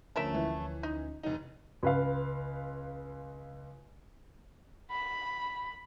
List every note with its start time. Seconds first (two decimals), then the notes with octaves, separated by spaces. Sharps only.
0.16 D2 F3 A3 C#4 A#4 E5
0.34 E3
0.83 D#4
1.23 F1 D#4
1.83 C#2 B4 F5
4.92 B5